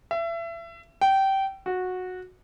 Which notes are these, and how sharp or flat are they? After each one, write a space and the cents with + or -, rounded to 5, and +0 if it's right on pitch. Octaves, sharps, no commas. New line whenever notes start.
E5 +30
G5 -20
F#4 -15